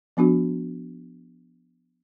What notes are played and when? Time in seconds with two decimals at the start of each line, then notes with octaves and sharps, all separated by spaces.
0.17 F3 B3 D4 F#4